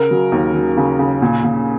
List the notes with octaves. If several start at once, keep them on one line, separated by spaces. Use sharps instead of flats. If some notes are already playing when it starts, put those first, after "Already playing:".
Already playing: C#3 A#4
F#3
D#2
F#3
C#3
C#3
A#2
A#2